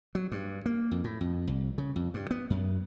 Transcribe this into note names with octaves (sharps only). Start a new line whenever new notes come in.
F#3
G2
A#3
F2
A2
F2
C2
C#3
F2
G2
B3
F#2